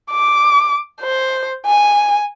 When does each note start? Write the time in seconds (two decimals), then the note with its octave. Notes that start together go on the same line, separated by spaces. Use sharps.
0.11 D6
1.01 C5
1.66 G#5